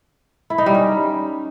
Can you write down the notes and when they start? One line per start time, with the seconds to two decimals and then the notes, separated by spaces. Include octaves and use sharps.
0.50 E4
0.58 D#4
0.66 G3
0.74 C#4